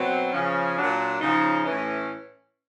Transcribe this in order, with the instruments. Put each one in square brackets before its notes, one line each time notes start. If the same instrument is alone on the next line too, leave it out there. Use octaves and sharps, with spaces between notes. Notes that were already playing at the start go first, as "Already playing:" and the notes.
Already playing: [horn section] B2 F#3 C4
C#3 F3 C#4
A#2 F#3 D4
C#3 F3 D#4
A2 E3 C#4